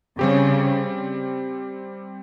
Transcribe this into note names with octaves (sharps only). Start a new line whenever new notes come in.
C#3 G3 C4 G4